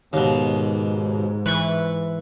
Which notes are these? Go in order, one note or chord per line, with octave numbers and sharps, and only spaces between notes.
D#2 G#2 B2
E3 B4 C#6